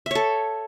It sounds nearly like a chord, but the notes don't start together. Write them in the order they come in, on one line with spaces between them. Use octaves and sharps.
E5 C#5 A4